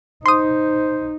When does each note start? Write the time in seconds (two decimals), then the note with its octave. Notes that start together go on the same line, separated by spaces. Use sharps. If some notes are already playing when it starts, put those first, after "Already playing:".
0.26 D#4 C5 C6 D#6